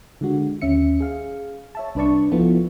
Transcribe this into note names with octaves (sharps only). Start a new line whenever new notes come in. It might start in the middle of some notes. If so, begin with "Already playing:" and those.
D3 G#3 F#4
D#2 C#4 E5 C#7
G#4 F5
C#5 E5 A5
C2 D4 B4 D5 A5 C#6
F3 B3 E4 F4 A4